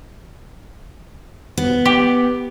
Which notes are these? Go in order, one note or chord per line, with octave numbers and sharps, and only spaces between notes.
B3
G4